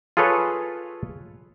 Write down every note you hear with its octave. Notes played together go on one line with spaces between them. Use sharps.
F4 G#4 A4 B4 C#5